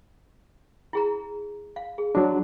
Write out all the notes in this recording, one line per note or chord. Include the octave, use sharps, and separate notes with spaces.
E4 G#4 A#5
F5
G#4
F#3 D4 F#4